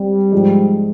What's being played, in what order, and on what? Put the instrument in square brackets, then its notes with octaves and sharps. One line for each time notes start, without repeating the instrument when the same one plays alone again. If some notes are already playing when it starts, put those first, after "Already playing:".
Already playing: [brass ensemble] G3 [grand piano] C4
[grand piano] G#2 F3 G#3